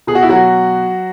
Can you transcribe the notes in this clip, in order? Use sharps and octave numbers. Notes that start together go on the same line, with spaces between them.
B2 G#4
F#4
E4
F#3 F#4